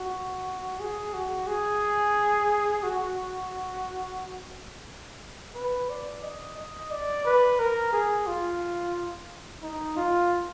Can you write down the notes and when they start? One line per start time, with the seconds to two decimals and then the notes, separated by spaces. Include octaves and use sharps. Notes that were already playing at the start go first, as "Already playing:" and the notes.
Already playing: F#4
0.80 G#4
1.14 F#4
1.47 G#4
2.83 F#4
5.55 B4
5.89 D5
6.23 D#5
6.57 D#5
6.91 D5
7.25 B4
7.59 A#4
7.93 G#4
8.26 F4
9.63 D#4
9.96 F4